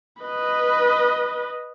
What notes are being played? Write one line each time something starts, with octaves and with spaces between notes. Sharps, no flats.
B4 D#5